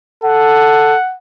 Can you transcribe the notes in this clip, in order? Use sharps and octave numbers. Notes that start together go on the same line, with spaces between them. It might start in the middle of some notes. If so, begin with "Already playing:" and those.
A4 F#5